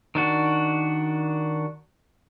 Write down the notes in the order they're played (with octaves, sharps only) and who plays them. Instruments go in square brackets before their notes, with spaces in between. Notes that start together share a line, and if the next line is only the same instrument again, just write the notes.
[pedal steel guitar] D#3 D4 F#4